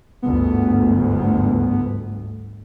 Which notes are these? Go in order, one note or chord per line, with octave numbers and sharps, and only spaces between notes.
G1 D2 G#2 B3